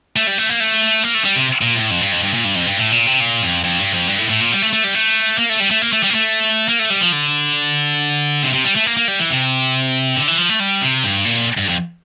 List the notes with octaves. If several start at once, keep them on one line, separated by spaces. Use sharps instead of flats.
A3
G3
A3
A#3
A3
A#3
A3
G3
C3
A#2
A2
F2
G2
F2
G2
A#2
G2
F2
G2
A2
A#2
C3
A#2
F2
F2
G2
F2
G2
A2
A2
A#2
G3
A3
A3
G3
A3
A#3
A3
G3
A3
A#3
A3
G3
A#3
A3
A#3
A3
G3
F3
D3
C3
C3
G3
A3
A#3
A#3
G3
E3
C3
D3
E3
F3
A3
G3
C3
G2
A#2
G2
F2